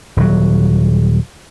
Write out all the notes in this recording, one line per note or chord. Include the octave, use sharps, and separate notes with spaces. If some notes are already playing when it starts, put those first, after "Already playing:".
D#1 F#3